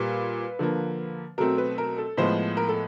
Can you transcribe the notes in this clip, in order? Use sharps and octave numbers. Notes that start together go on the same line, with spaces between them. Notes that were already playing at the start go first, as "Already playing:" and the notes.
Already playing: A#2 G3 A#3 B4
D3 F3 A#3
B2 F#3 A3 C4 A#4
B4
A#4
A4
A2 F3 G#3 B3 C5
A#4
A4